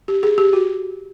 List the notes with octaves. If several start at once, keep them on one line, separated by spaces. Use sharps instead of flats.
G4
G#4
G4
F#4